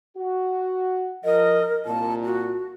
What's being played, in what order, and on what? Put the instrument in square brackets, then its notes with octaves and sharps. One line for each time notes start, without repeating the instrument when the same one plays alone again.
[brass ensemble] F#4
[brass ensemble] F3 D#5 [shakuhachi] A#4
[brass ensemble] C2 A#2 [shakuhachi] A5
[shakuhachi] F#4